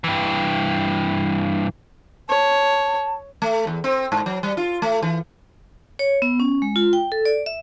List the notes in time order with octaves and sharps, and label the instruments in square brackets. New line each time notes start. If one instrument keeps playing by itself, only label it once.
[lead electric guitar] G2 E3
[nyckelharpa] C#5 [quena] A5
[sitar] A3
E2
C4
G#2
F#3
G3
F4
A3
E3
[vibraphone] C#5
B3
C#4
G#3
F4
G5
A4
D5
E5